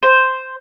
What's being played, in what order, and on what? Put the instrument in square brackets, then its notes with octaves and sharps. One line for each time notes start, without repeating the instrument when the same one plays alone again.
[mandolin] C5